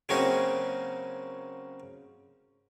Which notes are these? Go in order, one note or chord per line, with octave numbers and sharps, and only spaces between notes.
C#3 F#3 A#3 C4 C#4 D#4